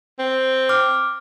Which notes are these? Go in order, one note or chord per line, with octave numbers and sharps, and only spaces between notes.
C4
D6 F6